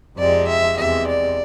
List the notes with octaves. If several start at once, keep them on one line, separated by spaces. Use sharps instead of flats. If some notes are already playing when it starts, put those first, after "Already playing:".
F2 C3 G#3 D5
E5
E2 C3 G#3 E5
D5